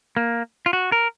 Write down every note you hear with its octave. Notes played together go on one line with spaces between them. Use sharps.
A#3
F4
F#4
A#4